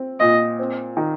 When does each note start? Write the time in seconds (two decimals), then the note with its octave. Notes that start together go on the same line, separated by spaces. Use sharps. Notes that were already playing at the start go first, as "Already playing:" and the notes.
Already playing: C4
0.20 A#2 D#5
0.59 C4
0.97 D#3